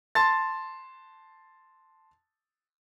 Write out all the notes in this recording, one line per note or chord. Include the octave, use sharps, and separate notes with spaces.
A5 C6 A6